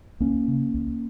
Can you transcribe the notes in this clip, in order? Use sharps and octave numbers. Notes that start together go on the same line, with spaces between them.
C#2 A#3 C#4
C#3
C#2